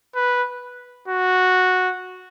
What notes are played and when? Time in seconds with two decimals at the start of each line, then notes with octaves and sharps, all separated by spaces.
0.16 B4
1.08 F#4